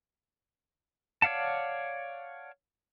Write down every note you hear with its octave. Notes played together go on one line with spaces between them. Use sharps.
C#5 D5 F5 F#5 A5